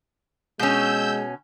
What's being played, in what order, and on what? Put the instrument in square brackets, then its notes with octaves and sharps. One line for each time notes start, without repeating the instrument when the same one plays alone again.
[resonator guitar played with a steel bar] B2 C#4 [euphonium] G#3 [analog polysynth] E6 G6